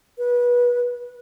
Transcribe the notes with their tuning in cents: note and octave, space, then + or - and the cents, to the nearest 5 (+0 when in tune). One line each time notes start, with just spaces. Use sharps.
B4 -25